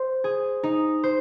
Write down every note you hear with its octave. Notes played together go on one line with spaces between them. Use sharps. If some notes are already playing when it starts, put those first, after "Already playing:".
Already playing: C5
G#4
D#4
C5